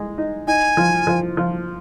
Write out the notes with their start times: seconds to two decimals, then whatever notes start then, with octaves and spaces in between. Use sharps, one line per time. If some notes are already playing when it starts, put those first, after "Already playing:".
Already playing: G#3
0.18 D#4
0.47 D#4 G#5
0.77 F3
1.07 F3
1.37 F3